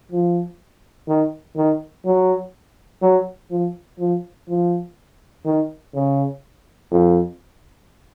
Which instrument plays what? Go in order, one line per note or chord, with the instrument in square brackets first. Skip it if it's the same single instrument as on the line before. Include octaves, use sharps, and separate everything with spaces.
[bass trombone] F3
D#3
D#3
F#3
F#3
F3
F3
F3
D#3
C#3
F2